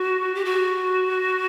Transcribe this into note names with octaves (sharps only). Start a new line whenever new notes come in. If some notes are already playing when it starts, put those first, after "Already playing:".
Already playing: F#4
G4
F#4